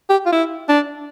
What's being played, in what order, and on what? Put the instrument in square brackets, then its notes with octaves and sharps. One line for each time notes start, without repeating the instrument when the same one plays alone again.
[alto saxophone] G4
F4
E4
D4